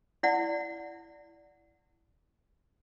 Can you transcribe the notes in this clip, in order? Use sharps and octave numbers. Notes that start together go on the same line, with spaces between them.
E4 D5 F#5